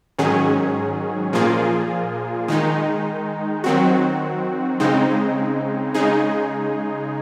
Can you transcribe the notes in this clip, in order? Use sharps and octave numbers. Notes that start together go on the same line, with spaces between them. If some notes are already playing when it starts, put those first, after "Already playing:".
G#2 D#3 F#3 C#4 G#4
A#2 F3 A#3 F4 G#4
D#3 G#3 D#4
D#3 F#3 C4 F#4
C#3 G#3 C4 D#4
C#3 G#3 D#4 G#4